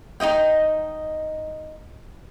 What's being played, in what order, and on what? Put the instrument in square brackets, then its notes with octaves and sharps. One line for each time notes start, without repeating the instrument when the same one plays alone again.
[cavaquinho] D#4 E4 D#5 G5